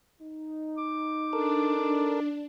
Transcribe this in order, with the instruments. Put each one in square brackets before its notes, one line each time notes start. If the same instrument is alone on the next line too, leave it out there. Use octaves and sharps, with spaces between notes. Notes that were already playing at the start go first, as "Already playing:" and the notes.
[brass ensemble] D#4
[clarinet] D6
[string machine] D4 [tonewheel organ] A4 A#4